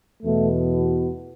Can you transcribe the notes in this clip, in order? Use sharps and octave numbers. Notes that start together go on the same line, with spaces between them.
E2 B2 A3